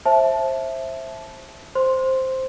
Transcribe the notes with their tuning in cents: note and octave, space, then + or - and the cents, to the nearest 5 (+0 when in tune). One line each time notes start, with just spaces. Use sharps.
C5 +30 E5 +0 A5 -15
C5 +0 C6 +0